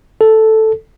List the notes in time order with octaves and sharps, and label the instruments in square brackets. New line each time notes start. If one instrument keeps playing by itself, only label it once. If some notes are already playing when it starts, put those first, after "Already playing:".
[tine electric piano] A4